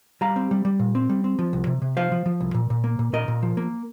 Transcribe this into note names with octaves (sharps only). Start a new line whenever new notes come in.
G3 F5 A#5
C4
G3
G3
A#2
C4
G3
C4
F3
C2
C3
C3
F3 C5 F5
F3
F3
C2
A#2
A#2
A#3
A#2
A#2 A#4 D#5
A#2
F3
A#3